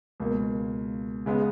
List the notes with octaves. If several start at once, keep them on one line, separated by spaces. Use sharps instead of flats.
C#2 B2 A#3
C#3 G#3 B3